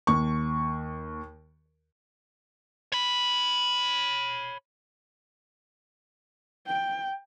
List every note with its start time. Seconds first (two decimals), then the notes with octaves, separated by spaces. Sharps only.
0.07 D#2 C#6
2.92 C#5 B5
6.67 G5